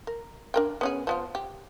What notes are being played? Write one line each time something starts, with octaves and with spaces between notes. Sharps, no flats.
A#4
D4 A#4 G5
B3 C#4 G#4
F3 B3 F4
G4